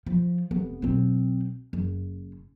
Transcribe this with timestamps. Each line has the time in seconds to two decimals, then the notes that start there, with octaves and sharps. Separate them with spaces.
0.06 F3
0.51 F1 B3
0.82 B1 C4
1.73 F#1